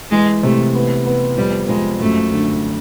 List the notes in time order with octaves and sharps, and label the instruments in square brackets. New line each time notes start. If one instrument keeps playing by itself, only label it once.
[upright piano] E3 [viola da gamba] G#3
[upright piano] C3 [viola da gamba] A3
[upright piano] B3
B3
[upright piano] F2 [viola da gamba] G3
[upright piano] F2 [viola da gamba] G#3
[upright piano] F#2 [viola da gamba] A3
[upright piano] D3